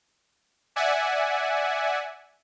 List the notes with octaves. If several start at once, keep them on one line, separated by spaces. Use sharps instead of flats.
D5 E5 F#5 G#5